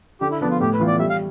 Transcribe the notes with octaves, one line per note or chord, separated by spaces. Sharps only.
D3 G4
E4
F3 B3 D4
F4
A2 G4
B4
E3 B3 F4
D5
G3 E5
F5